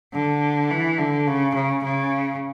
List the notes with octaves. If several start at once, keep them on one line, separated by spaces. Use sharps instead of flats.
D3
E3
D3
C#3
C#3
C#3